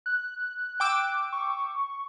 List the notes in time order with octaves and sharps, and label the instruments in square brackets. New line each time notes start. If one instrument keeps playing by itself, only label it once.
[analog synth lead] F#6
[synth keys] G5 D6 E6
[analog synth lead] C#6